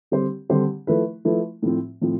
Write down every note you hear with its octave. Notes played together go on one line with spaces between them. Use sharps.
D3 G3 C4 G4 C5
D3 G3 C4 G4 C5
F3 A3 E4 B4
F3 A3 E4 B4
A2 F3 C4
A2 F3 C4